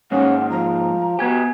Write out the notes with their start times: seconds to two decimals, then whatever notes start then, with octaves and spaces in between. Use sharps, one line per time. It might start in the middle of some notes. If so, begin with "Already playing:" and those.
0.12 G#2 G#3 A#3 C#4 F#5
0.50 F3 A#5
1.19 B3 F#4 G4 G#5 G#6